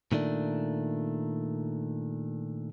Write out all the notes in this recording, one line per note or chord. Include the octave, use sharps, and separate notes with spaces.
A#2 D#3 A3 D4